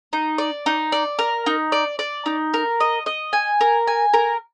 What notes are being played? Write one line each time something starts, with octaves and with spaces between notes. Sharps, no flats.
D#4
D5
D#4
D5
A#4
D#4
D5
D5
D#4
A#4
D#5
D#5
G#5
A#4
G#5
A#4